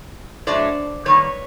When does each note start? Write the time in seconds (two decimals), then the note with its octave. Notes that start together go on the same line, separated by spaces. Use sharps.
0.47 A2 F#3 A3 D4 C5 D5
1.06 D#3 G3 A#3 B4 C#5